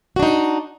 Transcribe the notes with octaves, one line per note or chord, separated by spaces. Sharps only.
D4 D#4 F#4